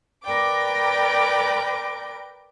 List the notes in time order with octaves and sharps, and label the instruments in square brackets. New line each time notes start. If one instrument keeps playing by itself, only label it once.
[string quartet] A#4 B4 D5 G5 D6